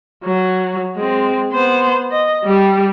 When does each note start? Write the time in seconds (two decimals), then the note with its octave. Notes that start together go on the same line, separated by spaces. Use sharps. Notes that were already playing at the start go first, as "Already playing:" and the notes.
0.23 F#3
0.96 G#3 C4
1.52 B3 C5
2.11 D#5
2.44 G3 G4